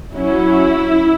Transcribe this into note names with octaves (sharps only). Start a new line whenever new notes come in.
F#3 C#4 E4